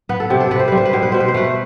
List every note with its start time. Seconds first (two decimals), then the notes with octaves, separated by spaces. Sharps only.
0.09 B3 B4
0.20 A4
0.30 C3 G4
0.40 A4
0.51 C3 B4
0.59 C5
0.68 G3 B4
0.77 C5
0.85 B4
0.93 B2 C5
1.03 B4
1.12 B2 C5
1.20 B4
1.28 C5
1.34 A3 B4